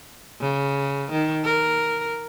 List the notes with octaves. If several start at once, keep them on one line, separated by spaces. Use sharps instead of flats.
C#3
D#3
A#4